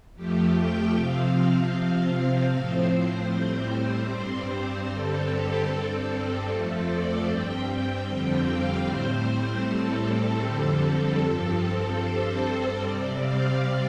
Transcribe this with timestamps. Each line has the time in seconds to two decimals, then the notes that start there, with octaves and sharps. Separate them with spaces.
0.15 F2 F3 A3 G4
0.54 G5
0.94 C3 F3 C4 F5
1.73 C3 F3 C4
2.52 A2 F3 C4 C5
2.92 C5
3.32 A2 G3 C4 C5
4.10 G2 G3 C4 C5
4.50 C5
4.90 G2 D3 G3 C4 A4
5.29 G4
5.69 G2 G3 C4 A4
6.47 F2 F3 A3 C4 A4
6.87 D5
7.26 G2 G3 C4 G5
8.05 F2 D3 G3 C4 G5
8.46 F5
8.84 A2 G3 C4 C5
9.64 A2 G3 C4 A4
10.04 A4
10.43 F2 D3 G3 C4
11.22 G2 F3 C4
12.01 G2 G3 C4 C5
12.80 C3 G3 C4 D5
13.20 F5